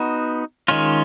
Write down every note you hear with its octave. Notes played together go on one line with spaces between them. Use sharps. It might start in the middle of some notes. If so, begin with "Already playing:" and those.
Already playing: B3 D#4 F#4
D#3 G#3 C#4 F4